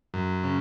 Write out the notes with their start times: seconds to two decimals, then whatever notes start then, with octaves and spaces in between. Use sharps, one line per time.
0.14 F#2
0.44 C#3